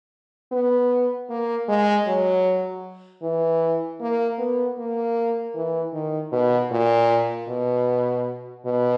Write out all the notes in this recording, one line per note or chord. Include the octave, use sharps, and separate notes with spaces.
B3
A#3
G#3
F#3
E3
A#3
B3
A#3
E3
D#3
B2
A#2
B2
B2